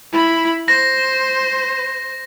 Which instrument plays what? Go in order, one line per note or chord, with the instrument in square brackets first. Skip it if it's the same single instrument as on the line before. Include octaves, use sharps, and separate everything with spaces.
[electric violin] E4 B5
[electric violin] C5 [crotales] A#6